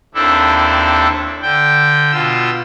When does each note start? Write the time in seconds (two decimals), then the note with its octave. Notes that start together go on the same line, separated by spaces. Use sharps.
0.14 D#2 C4 D4 E4 A4
1.42 D3 G5
2.12 B2 F4 E6